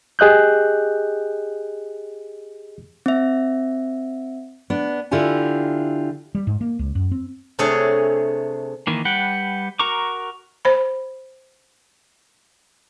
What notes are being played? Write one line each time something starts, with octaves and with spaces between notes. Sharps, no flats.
G4 G#4 D#5 F#6 G6
C4 E5
B3 D4
D3 E4 F4 G4 G#5
G3
G#2
A#3
C#2
F#2
C4
C3 A3 D4 G#4 C#5
D#3 E3 A#3
G3 B4 F#5 G5
F#4 A#4 A#5 C#6 D6
C5 B5